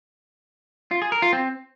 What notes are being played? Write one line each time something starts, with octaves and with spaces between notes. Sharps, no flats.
F4
G#4
A#4
F4
C4